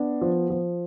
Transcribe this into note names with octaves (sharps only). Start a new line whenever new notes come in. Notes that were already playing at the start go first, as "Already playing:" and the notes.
Already playing: B3 D4
F3
F3